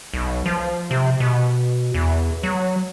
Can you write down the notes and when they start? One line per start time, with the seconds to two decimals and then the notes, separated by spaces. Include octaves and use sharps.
0.14 B1
0.46 F3
0.91 C3
1.20 B2
1.94 E2
2.43 F#3